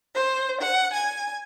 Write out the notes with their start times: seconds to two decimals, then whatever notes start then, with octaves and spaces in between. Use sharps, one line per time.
0.15 C5
0.60 F#5
0.93 G#5